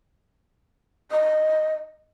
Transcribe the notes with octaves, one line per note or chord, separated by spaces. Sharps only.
D#5